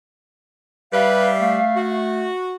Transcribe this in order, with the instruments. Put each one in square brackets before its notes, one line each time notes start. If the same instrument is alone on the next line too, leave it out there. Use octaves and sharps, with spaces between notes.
[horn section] G3 [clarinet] B4 [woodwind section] E5 F5
[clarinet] A3
[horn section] F#4